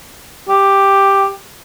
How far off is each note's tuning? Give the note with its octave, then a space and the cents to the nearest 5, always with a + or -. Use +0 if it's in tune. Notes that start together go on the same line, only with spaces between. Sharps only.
G4 +5